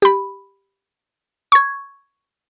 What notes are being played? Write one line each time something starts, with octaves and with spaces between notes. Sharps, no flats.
G4 B5
C#6 G#6